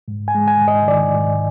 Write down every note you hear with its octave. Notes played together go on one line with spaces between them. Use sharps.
G#2
G#5
G#3
G#5
G#2
D#5
D#3 D5
G#2